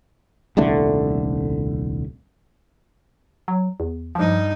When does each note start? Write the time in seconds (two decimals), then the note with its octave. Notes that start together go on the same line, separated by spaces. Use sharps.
0.57 D#1 C2 D3 A3
3.48 F#3
3.80 E2
4.15 G2 F3 D#4